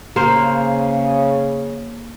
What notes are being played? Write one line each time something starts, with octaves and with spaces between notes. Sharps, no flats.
C#3 A#3 C5